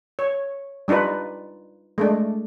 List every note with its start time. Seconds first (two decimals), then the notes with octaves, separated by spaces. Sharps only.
0.19 C#5
0.88 G3 D4 D#4 F4 B4
1.98 G#3 A3 D4